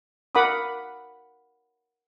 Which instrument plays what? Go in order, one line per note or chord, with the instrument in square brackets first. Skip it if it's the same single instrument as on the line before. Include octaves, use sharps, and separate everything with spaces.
[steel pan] A#4 F#5 B5 D6 D#6